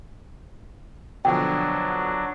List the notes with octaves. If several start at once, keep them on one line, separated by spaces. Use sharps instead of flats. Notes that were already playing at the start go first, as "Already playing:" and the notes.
B2 D3 F3 F#3 D4 G5